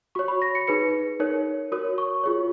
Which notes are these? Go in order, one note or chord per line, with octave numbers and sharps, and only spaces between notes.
F#4 C#5 C#6
B5
A#6
C#7
D#4 G#4 B4 C#7
D#4 A#4 C#5
F#4 A#4 C#5 D#6
C#6
F4 G#4 C#5